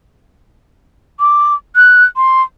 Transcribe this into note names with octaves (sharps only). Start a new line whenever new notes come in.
D6
F#6
C6